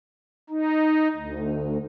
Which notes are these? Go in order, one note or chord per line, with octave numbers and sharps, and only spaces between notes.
D#4
D2